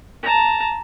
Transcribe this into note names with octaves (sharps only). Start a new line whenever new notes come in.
A5 A#5